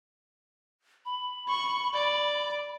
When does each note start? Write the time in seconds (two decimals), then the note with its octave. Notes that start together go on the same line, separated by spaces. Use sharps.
1.05 B5
1.48 C#6
1.94 D5